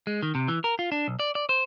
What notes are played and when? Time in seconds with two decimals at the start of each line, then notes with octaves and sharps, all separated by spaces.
0.07 G#3
0.23 D#3
0.35 C3
0.48 E3
0.64 A#4
0.79 F4
0.92 D4
1.08 B1
1.20 D5
1.35 D5
1.49 C5